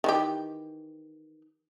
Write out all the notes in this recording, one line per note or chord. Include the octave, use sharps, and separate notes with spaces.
D#3 E3 G4